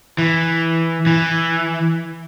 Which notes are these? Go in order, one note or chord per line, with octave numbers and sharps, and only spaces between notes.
E3
E3